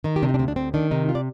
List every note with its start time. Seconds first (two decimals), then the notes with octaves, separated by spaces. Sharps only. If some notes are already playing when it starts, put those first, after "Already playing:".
0.04 D#3 D#4
0.16 G4
0.23 C3 D4
0.29 D#4
0.34 D4
0.39 D2 C4
0.48 D4
0.56 D2 C4
0.74 D#3 D4
0.91 C3 D#4
1.09 F4
1.15 D5